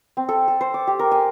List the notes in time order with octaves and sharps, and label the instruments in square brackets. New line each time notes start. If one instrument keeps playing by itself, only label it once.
[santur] C4
A4
A4
C5
D6
G4
A#4
G#5